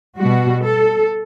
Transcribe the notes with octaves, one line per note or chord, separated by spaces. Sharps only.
B2 G3 F#4
A4